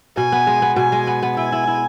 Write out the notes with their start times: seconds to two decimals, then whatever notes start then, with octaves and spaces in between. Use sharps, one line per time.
0.16 B2 G#5
0.32 B3
0.47 G#3
0.62 B3
0.76 B2 G#5
0.92 G#3
1.07 B3
1.23 B3
1.37 E4 G#5
1.52 E4
1.67 E4